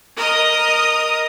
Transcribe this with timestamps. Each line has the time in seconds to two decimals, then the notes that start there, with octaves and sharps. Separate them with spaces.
0.17 A#4 D#5 D#6